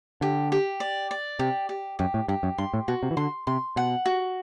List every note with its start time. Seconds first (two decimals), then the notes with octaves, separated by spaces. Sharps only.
0.21 D3 G4
0.52 G4
0.80 D5
1.11 D5
1.39 C3 G4
1.69 G4
1.99 F#2 G4
2.14 A2
2.28 G2 G4
2.43 F#2
2.58 G2 C6
2.73 A2
2.88 B2 F#4
3.03 C3
3.11 E3
3.17 D3 C6
3.47 C3 C6
3.76 B2 F#5
4.06 F#4